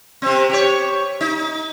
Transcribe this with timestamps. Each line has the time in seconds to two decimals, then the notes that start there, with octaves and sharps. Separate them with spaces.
0.22 C3 C4
0.50 G4 C#5
1.21 D#4